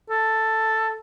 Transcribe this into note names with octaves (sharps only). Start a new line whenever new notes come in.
A4